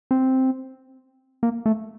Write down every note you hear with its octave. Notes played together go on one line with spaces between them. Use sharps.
C4
A#3
A3